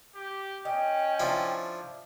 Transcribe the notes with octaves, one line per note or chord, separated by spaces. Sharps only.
G4
C#4 D#5 G5
F3 D4 E4